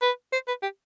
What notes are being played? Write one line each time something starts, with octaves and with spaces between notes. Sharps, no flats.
B4
C5
B4
G4